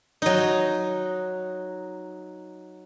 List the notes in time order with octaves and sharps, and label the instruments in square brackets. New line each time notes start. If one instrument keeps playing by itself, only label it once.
[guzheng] F#3 D#4